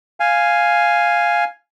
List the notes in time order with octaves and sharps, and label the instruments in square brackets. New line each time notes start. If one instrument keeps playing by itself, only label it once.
[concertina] F5 G#5